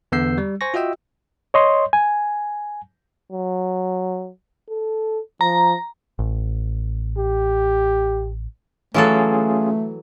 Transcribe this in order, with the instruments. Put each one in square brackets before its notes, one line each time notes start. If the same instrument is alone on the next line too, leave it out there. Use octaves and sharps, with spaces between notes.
[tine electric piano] E2 D3 B3 E6 G6 C7
G3
C5 G#5 C#6 A#6
F4 F#4 D#5 E5 G5 E6
[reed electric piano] C#5 D#5 C6
G#5
[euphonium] F#3
A4
[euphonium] F3 [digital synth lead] A#5
[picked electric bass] A1
[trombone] G4
[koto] E3 F#3 A4 [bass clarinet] A3 [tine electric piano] C#4 F4 G#4